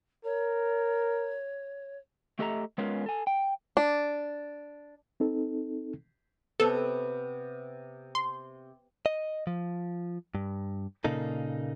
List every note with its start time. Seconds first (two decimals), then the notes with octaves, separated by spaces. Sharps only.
0.25 A#4 C#5
2.39 A3 G4 A4 D#5 E5 A#5
2.78 G#3 B3 C#4 F4 A#4
3.06 A4 G#5
3.27 G5
3.77 D4
5.20 C4 D#4 A4
6.60 C3 B3 A4
8.15 C6
9.06 D#5
9.47 F3
10.35 G2
11.04 A#2 C#3 A#3 D#4 A4